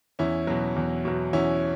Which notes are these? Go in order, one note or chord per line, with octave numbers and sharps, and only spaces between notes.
E2 C#4 E4
B2 F#3
E2
B2 F#3
E2 C#4 E4